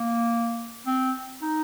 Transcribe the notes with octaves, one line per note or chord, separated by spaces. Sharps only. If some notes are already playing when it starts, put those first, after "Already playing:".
Already playing: A#3
C4
D#4